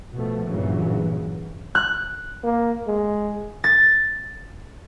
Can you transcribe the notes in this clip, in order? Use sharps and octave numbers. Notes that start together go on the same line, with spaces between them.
B2 F3 A3
G2 A#2 C#3 E3 F#3
F#6
A#3
G#3
A6